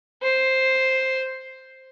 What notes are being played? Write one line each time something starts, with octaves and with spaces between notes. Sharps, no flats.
C5